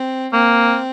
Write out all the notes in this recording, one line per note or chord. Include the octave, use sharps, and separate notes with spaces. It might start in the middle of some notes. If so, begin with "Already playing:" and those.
Already playing: C4
A#3 C4